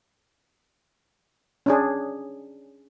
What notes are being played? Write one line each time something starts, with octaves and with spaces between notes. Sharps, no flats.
C#4 D4 G#4